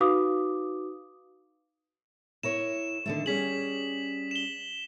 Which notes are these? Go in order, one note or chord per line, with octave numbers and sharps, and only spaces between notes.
D#4 F#4 B4 F5 D6 D#6
E4 A#4 C#5 E7
D3 D#3 A3
G3 C#4 G#4 B6 F#7
E7 G7